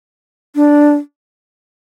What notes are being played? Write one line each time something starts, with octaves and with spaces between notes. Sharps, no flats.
D4